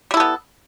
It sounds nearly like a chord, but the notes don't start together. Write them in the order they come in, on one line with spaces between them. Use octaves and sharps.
G3 E4 A4 B3